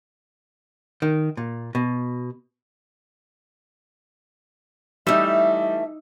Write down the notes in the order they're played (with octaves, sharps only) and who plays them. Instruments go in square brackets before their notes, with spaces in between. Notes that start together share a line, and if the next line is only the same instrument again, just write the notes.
[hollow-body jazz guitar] D#3
A#2
B2
[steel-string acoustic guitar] E3 A3 [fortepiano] G3 [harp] D#4 E6 [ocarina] E5